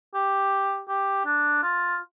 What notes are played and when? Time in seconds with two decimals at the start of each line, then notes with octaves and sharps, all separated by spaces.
0.14 G4
0.88 G4
1.26 D4
1.63 F4